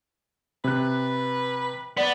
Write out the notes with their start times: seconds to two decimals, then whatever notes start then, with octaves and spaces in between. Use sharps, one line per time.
0.64 C3 B4 F#6
1.97 B3 D5